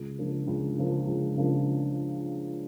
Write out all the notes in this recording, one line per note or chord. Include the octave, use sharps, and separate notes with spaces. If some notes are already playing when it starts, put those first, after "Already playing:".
Already playing: C#2
C#3 F3 A#3 D4
C#2
C#3 F3 A#3 D4
C#2
C#3 F3 A#3 D4